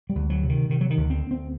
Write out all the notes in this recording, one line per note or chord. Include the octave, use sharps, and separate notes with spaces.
G3
D2
F#3
C3
D#3
C3 D#3
F#3
D#3
D2
C4
D2
C4